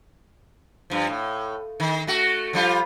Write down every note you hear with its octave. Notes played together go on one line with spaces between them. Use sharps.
G2 F3
A2
D#3
A3 F#4
F3 G3 F4